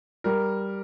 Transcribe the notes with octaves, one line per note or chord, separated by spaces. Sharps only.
G3 A#4